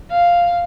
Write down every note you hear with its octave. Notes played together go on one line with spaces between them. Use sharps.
F5